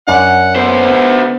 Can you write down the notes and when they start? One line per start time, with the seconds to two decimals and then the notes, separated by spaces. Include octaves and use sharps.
0.07 F#2 D4 F#5
0.56 D3 B3 C5